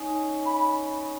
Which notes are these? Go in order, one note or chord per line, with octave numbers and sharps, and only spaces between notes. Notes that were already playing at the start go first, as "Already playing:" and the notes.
Already playing: C#4 D#4
B5